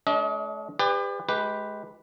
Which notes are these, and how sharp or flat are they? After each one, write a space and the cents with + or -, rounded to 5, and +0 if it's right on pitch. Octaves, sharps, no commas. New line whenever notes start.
A3 -40 D4 -35 D#5 +35
G4 +35 B4 +25 D5 +0
G#3 +25 G4 -5 B4 +0